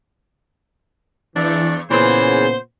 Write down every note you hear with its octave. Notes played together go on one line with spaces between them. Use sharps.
E2 E3 D4
A#2 C#3 E3 B3 C#4 G#4 C5